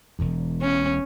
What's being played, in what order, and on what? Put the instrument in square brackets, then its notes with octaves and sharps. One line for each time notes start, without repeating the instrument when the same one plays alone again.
[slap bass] E1 E2
[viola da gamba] C#4